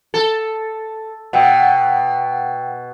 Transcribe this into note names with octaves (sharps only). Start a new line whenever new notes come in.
A4
B2 F#5 G5 E6